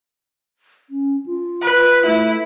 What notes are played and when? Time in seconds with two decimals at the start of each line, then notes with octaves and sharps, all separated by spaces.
0.90 C#4
1.26 F4
1.61 B4
2.06 A3 E4